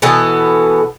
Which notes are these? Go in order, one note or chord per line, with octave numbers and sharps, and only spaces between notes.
B2 E3 B3 A4